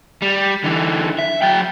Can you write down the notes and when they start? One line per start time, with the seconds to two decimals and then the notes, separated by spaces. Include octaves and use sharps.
0.22 G3
0.64 D3 E3
1.19 E5
1.42 F#3 G5